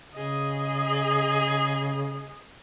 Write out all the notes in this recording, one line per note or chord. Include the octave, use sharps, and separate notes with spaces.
C#3 G#4 D#5